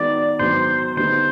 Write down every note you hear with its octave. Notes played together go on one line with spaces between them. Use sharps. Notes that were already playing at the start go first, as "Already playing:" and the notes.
Already playing: D#3 G#3 B3 D#4 F#4 D5
G#2 D#3 F#3 B3 C5
D3 G3 B3 D#4 C5